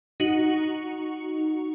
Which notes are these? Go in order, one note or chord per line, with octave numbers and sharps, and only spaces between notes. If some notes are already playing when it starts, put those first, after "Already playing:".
D#4 F#4 C#7